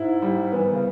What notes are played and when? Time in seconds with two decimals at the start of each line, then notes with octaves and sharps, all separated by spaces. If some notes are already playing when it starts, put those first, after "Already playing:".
Already playing: G#2 E4
0.22 G3
0.52 E3 B3
0.64 D#3
0.73 C#3